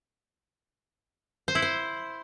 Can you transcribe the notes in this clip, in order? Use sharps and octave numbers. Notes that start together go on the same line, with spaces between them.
C5
E4
C5